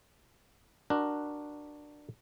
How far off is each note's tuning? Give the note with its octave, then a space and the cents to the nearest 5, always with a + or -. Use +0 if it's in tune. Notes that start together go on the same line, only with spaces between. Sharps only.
D4 +10 F#4 +0 A#4 +5